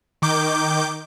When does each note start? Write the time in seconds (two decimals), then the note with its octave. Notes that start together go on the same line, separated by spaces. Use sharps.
0.22 D#3 D6 G6